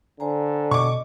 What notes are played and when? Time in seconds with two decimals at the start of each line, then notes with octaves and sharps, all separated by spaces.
0.20 D3 C5 G#5 A#5
0.71 B2 D5 D#5 C#6 D6